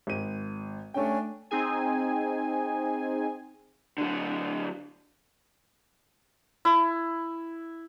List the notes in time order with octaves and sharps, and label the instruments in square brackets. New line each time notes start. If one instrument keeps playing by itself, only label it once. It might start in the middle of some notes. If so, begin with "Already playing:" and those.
[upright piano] G#1 D#7
[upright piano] A3 G5 [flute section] C#4 D4 G#5
[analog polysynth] C4 D#4 G#4 G#5
[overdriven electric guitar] D3 F#3
[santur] E4